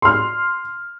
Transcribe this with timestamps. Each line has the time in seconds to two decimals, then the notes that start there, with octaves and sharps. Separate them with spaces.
0.02 C6 F6